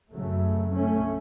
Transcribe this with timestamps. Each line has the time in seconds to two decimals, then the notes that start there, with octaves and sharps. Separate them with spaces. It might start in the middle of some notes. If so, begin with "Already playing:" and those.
0.15 F#2 C#3 F#3 A3
0.75 A3 C#4